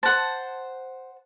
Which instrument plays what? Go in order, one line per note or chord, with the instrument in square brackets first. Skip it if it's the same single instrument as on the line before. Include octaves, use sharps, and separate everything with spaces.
[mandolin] C5 [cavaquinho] F#5 A5